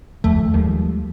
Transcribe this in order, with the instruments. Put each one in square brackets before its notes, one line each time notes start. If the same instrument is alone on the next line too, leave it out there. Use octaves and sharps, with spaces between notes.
[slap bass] D#2 F3 [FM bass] A3
[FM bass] D#2 [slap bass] F3 G3 G#3